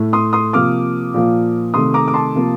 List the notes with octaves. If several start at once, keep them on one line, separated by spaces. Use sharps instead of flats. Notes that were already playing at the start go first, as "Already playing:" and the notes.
Already playing: A2 A3
C6 D#6
C6 D#6
C3 F3 A#3 D6 F6
A#2 F3 A#3
C3 D#3 A3 C6 D#6
A#5 D6
D6
A5 C6
C3 F3 A#3